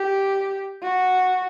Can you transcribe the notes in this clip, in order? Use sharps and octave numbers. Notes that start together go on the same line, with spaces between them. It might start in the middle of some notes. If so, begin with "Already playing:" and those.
Already playing: G4
F#4